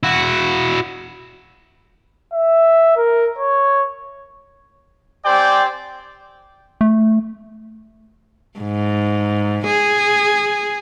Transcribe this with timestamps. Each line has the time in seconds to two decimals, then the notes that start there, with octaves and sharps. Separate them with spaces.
0.03 E4 F#4
2.33 E5
2.97 A#4
3.39 C#5
5.26 C4 G4 C5 D5 G5 G#5
6.81 A3
8.60 G#2
9.67 G#4